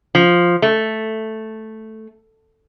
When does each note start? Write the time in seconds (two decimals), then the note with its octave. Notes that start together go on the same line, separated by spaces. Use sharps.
0.15 F3
0.62 A3